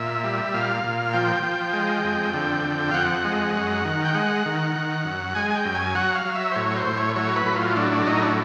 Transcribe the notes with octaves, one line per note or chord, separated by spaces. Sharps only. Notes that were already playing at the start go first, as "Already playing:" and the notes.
Already playing: A#2 E5
G3
A#2 F5
A#2
F3 G5
F3
G#3
F2
D3
F2
F5
F2 F#5
G#3
F#2
D#3
G5
G#3 F#5
D#3
D#3
F#2
G#3 G#5
G#5
G5
F#2
G#5
F#3 F#5
F5
F#3
E5
C5
A2 C#5
C5
A2
C#5
F#3 C#5
B4
A2
F4
F#3 D4
D4
A2 D#4
D4